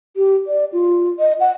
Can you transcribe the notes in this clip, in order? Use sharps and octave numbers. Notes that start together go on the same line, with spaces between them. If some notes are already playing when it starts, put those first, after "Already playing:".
G4
D5
F4
D#5
F#5